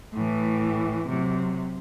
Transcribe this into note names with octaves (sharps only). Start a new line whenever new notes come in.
A2 E3
C3 F#3